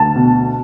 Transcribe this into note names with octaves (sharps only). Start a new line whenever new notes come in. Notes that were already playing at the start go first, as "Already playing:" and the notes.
Already playing: D2 A5
B2